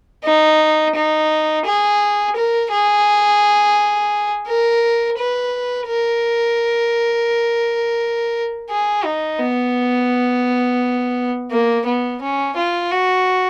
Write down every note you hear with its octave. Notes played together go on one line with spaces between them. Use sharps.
D#4
D#4
G#4
A#4
G#4
A#4
B4
A#4
G#4
D#4
B3
A#3
B3
C#4
F4
F#4